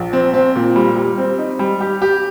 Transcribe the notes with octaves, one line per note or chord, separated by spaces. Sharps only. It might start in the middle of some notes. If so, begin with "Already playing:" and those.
Already playing: A#1
C4
C4
A#2
G3
G3
C4
D#4
G3
G4
G4